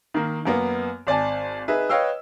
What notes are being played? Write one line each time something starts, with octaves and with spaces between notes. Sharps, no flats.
D#3 A#3
F#2 A#3 B3
G#1 D5 G#5 A5
D#4 G#4 B4 E5
B4 C#5 D#5 F5 G5 E6